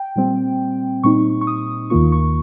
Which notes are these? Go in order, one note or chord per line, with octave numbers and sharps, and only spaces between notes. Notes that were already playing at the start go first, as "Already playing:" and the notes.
Already playing: G5
A#2 G3 C4
A#2 G3 C4 D#4 C#6
C#6
D#6
D#2 D#3 A#3 F4 C#6
C#6